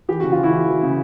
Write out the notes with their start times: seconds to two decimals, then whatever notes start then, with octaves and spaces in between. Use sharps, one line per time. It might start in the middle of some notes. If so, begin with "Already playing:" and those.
0.09 E3 G4
0.20 C#3 F#4
0.32 F4
0.38 E3
0.43 E4 F#4
0.52 E3
0.68 E3
0.83 C#3